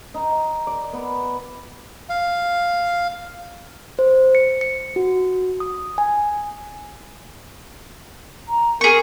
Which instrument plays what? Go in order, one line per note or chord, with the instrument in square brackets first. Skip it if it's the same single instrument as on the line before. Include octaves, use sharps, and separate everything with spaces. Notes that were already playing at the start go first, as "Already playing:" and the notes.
[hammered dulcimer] D#4
D5
B3
[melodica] F5
[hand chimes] C5
C#7
C#7
F#4
D#6
G#5
[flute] A#5
[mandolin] G#4 C#6 [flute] A#4